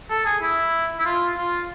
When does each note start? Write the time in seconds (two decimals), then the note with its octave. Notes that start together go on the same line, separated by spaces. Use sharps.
0.10 A4
0.25 G#4
0.42 E4
0.99 E4
1.06 F4
1.37 F4